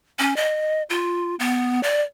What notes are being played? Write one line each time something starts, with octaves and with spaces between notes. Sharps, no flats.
C#4
D#5
F4
B3
D5